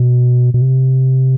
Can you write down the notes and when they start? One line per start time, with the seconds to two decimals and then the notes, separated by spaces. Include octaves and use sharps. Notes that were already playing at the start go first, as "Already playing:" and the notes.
Already playing: B2
0.54 B2
0.62 C3